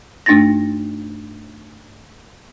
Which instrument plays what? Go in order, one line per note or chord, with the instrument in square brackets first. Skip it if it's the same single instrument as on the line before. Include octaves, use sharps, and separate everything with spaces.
[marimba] G2 A3 D4 D#4 A6 A#6